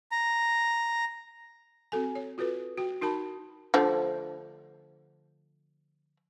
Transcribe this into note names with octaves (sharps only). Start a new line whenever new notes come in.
A#5
C4 F#4 A4 G#5
C#5
F4 F#4 A4 B4
F#4 G5
D#4 F#4 A#4 A5 B5
D3 F3 A3